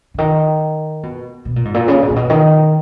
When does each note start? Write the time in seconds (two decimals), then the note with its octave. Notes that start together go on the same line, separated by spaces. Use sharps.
0.14 C#3
0.18 D#3
1.03 B2
1.45 B2
1.56 A#2
1.65 G#2
1.74 A#2
1.88 C#3
2.03 B2
2.10 A#2
2.16 B2
2.30 D#3